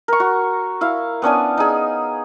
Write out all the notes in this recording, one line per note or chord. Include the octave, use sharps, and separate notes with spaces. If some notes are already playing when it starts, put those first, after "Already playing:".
A#4 C#6
F#4
E4 F5
B3 C#4 D4 G#5
D#4 G#4